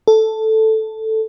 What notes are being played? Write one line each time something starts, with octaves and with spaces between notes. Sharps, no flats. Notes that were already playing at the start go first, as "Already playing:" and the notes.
A4